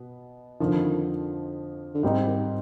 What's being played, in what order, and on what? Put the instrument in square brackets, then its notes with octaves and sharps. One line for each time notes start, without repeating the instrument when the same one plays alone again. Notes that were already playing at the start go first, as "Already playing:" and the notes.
Already playing: [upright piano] B2 B3
[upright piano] F2 D3 F3 [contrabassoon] D#3
[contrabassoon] D3
[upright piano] G#2 G3 C4 D#4 [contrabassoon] D#3
[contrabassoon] D#3